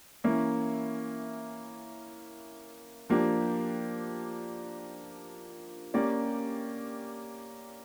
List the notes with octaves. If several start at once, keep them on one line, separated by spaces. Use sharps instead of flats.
E3 A#3 C#4 E4
F3 A#3 D4 G4
A#3 C#4 G4 D5